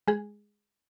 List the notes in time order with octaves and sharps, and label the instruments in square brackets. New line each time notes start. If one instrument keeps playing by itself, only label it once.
[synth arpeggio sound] G#3 G#4